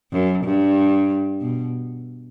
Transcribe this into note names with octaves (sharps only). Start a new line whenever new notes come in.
F#2
G2
B2